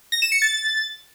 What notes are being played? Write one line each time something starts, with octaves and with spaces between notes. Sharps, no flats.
A#6
E7
C#7
A6